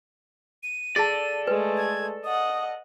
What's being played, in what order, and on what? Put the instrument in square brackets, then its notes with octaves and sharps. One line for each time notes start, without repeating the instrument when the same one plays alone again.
[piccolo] D#7
[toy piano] G#4 A5 [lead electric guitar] A4 D5
[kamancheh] G#3 A3 [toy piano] B4
[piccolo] G#6
[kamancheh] D#5 F#5 [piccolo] D#6